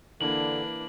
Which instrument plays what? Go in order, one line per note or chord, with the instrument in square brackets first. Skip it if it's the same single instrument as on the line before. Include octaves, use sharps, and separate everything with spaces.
[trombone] D3 [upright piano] E3 A#3 [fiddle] D4 B4 [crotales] F#7